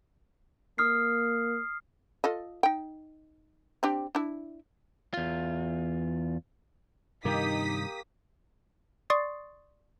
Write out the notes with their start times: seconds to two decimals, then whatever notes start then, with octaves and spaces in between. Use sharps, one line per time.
0.78 A#3 D#6 F6 C7
2.24 F4 A4 D#5
2.63 D#4 G5
3.83 C4 D4 G4
4.15 D4 E4
5.14 E2 F4
7.25 G2 C3 D#3 A#3 D#4 G4 D#6 B6
9.10 D5 C6 C#6 D#6 A6 C7